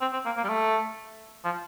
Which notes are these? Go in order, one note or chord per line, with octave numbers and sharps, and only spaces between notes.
C4
C4
A#3
A#3
G3
A3
F3